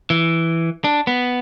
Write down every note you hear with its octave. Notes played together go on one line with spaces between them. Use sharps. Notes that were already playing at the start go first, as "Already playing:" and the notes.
E3
D4
B3